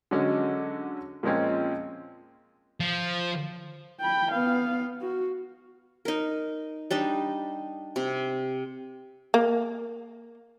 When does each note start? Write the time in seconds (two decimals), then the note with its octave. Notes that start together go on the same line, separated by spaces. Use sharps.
0.11 D3 F#3 G#3 C#4
1.23 A#2 F3 G#3 C4 C#4
2.80 F3
4.00 G5 B5
4.31 B3 F5
5.01 F#4
6.05 D#4 A#4
6.91 G3 D4 D#4 D#5
7.96 C3
9.34 A#3